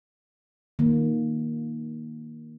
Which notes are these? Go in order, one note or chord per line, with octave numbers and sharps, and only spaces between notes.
D#3 A#3